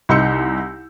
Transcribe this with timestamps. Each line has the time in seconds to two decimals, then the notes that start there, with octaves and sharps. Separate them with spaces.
0.09 C2 D#4 C6 E6 G6 C#7